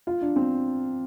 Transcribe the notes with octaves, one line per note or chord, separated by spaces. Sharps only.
F4
D4
C4